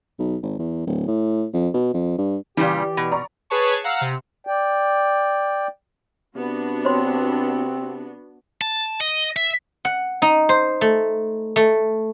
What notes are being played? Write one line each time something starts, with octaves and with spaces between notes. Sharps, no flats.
B1
G#1
E2
D1
A2
F2
B2
F2
G2
A#2 C#3 E3 G3 G4 D5
B2
D5 A#5 C#6
G#4 B4 C#5 A5 C#6
F5 F#5 A#5 E6 F6
C3
D5 G5
C3 B3 D4 F#4
C4 C5 C#5 C6
A5
D#5
E5
F#5
D#4
C5
A3
A3